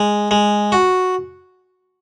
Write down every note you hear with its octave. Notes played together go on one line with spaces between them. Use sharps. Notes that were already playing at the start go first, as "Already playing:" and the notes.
Already playing: G#3
G#3
F#4